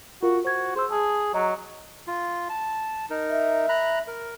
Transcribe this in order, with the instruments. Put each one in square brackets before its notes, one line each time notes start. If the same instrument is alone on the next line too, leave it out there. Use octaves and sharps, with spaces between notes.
[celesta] F4 A#4 F5 [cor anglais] F#4
[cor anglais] F#4 [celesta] C5 G#6
[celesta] G#4 E6 [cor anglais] C5
[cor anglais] G#4 [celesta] A5
[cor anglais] F#3 [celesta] D#5 A#5
[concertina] F4
A5
D#4 A#4
[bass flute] E5
[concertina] A#5 B5 F#6
A#4